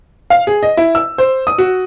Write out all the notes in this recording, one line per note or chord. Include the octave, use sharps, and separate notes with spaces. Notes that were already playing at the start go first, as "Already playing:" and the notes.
F5
G#4
D#5
E4
E6
C5
D#6
F#4